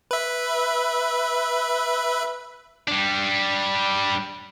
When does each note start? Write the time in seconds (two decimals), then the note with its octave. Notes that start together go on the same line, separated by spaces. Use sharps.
0.11 B4 E5
2.88 G3 D4